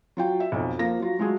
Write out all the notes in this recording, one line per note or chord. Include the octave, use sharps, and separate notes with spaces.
F#3 F4 G5
E5
B1 F2
F3 A#3 A#6
F#3 F4
F#3 G#3 A3 F4 F#4 G#4